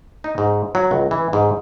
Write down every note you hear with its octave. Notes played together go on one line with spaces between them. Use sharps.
D#4
G#2
F#3
C#2
E3
G#2